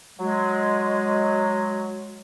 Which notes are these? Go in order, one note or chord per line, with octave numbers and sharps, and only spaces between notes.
F#3 G#3